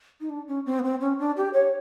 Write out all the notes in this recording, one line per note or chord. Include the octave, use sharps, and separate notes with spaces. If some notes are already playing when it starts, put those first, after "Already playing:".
D#4
D4
C#4
C4
B3
C4
C#4
D4
G4
C#5